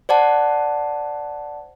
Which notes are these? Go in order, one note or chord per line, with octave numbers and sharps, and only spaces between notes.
C5 D5 F#5 A5